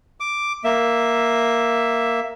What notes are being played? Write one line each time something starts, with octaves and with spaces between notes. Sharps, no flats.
D6
A#3 E5